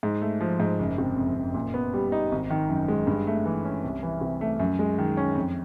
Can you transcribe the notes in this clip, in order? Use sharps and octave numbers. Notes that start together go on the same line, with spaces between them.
G#2
A3
F3
G#2
F#1
C3
F2
F#1
A#2
B3
G3
D#4
G#1
D#3
F#2
G#3
G2
A3
E3
C#4
C2
E3
C3
A3
F#2
G#3
D#3
C#4
F2